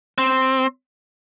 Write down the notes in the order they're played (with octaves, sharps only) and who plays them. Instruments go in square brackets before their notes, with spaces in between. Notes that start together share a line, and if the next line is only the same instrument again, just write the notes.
[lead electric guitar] C4